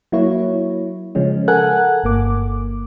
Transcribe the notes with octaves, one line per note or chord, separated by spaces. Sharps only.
F#3 A#3 E4 C#5
C#3 F3 G#3 C#4
A4 A#4 F#5 G#5 F#6
G1 A#3 D6